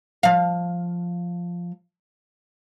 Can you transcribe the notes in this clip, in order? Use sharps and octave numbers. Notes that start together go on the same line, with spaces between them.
F3 F5